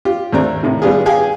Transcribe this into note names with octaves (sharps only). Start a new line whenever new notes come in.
F4 G4
D#2 A3 C4 D4 A#5
A2 C3 D#3
G3 B3 D4 F4 G4 G#4
G4 G#4 F5 G5 G#5